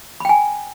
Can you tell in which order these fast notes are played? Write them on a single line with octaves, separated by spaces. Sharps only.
B5 G5 G#5